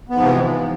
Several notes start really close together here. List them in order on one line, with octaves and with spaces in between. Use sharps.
B3 G#2 F3 C3 E3